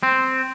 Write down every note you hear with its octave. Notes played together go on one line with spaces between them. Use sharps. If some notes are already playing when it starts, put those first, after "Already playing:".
C4